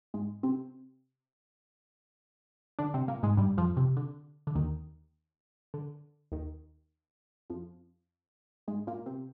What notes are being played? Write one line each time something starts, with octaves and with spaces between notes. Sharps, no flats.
G#2 G#3
C3 C4
D3 D4
C3 C4
A#2 A#3
G#2 G#3
G2 G3
F2 F3
C3
D3
D3
D#2 D#3
D3
D#2 D#3
F2 F3
G#2 G#3
A#2 A#3
C3 C4